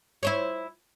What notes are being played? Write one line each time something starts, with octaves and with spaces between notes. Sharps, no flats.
E4 C5 C#5